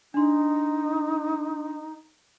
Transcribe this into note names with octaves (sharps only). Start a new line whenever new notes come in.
D4 D#4 C6